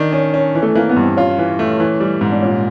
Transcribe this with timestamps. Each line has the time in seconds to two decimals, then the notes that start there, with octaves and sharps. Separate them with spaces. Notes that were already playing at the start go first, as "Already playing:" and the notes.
Already playing: D#3 D4
0.13 C#4
0.34 C#4
0.55 E3
0.62 A3
0.75 E3 A#3
0.89 B3
0.96 G2
1.04 C4
1.17 C#4 F4
1.38 E3
1.59 A3
1.80 E3
2.00 G3
2.21 G#2
2.32 D4
2.43 A#2 C#4